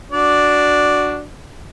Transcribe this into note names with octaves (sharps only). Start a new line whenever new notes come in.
D4 F#4 D5